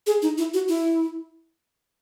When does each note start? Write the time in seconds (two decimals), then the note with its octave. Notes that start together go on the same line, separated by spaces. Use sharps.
0.07 G#4
0.22 D#4
0.38 E4
0.54 F#4
0.69 E4